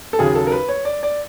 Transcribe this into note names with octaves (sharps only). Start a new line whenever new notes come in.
A4
D#2 C#3 F#3 G#4
A4
A#4
B4
C#5
D5
D5